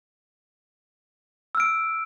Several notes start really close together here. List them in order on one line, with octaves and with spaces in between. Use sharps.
E6 F6 D7